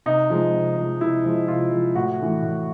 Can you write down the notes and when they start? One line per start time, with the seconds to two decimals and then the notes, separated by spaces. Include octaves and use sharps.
0.06 C3 D#4
0.30 F3 G#3
0.53 C3
0.77 F3 G#3
1.01 C3 E4
1.25 F3 G#3
1.48 C3 F4
1.72 F3 G#3
1.95 A2 F#4
2.19 E3 A3
2.42 A2